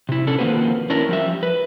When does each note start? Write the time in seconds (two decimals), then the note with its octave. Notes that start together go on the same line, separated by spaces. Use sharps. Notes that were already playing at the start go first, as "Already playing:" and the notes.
0.09 C3 E4
0.27 C#4 D4 A4
0.39 D#3 F3 A#3 C4 F#4 B4
0.90 C#4 D4 E4 A#4
1.09 F3 G3 E5
1.43 B4